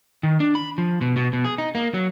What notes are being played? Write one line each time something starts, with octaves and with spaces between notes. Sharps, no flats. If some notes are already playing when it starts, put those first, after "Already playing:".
D#3
D4
B5
F3
B2
B2
B2
G#4
D#4
A#3
F#3